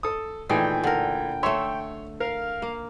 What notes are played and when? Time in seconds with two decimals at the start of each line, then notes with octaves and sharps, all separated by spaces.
0.03 A4 D#6
0.49 A#2 D#3 E3 A3 G#4 G5
0.84 D3 A#4
1.43 A3 C#5 E5 C6
2.20 A#4 F5
2.62 A#3